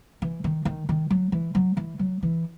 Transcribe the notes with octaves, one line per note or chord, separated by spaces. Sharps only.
E3
D#3
D#3
D#3
F#3
E3
F#3
E3
F#3
E3